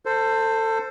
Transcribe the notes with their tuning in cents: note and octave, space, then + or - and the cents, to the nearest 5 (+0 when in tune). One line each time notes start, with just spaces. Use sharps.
A4 +25 C5 +0